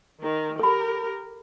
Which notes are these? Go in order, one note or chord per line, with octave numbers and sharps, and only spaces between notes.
D#3 A#4
G4 A4 A#4 B5